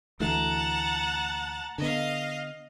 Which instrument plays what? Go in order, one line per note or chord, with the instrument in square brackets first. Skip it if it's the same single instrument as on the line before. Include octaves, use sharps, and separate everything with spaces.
[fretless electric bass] D2 E3 A3 [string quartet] F#5 A5 A#5
[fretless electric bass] D3 B3 [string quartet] D#5 F5